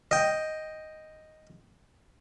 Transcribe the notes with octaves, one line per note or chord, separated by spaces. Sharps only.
D#5 G5